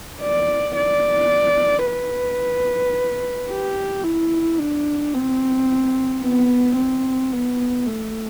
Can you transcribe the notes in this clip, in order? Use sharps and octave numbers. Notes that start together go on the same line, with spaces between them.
D5
D5
B4
G4
E4
D4
C4
B3
C4
B3
A3